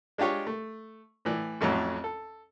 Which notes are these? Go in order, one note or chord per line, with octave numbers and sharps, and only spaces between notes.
G#3 D4 F4 G4 C#5
A3
A2 E3 D5
A1 F2 A2 F#3
A4